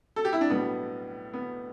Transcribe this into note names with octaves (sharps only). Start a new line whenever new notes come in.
A4
G4
E4
D4
B1 A2 G3 B3
B3